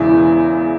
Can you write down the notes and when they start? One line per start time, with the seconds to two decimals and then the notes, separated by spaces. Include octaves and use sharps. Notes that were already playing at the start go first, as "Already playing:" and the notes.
Already playing: E1 E2 C#3 E3 E4